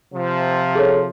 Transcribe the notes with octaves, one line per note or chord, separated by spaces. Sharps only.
C3 F3
G#4 A4 C#5